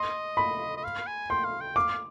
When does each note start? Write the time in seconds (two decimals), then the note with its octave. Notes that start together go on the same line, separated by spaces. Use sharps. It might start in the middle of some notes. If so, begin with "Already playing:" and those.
Already playing: D#5 C6
0.37 B5
0.77 D#5
0.84 F5
1.07 G#5
1.30 G5 C6
1.45 F5
1.61 G5
1.76 F5 D6